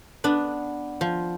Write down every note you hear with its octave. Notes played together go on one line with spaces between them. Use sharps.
B3 D4
F3